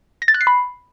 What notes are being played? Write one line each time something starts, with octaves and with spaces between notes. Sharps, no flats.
A#6
A6
F#6
C7
B5